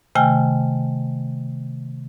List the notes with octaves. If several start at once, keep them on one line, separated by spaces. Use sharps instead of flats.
C3 D#3 A3 G5 G#5 F6